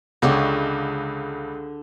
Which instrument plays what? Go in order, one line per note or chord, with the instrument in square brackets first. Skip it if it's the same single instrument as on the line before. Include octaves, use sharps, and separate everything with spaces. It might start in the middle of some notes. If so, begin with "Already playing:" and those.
[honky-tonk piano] C#2 [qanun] D3 G4 C#5